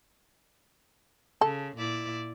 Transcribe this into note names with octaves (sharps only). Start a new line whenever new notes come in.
C#3 A4
A#2 E4 D5